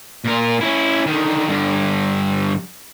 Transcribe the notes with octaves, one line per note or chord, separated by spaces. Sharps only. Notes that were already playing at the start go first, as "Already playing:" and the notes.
A#2 A#4
C#4 E4
D3 D#3
G2 D3